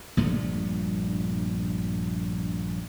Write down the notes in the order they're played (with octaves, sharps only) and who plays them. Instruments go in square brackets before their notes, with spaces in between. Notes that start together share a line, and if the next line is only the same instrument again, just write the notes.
[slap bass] A#1 G2 A#2 A3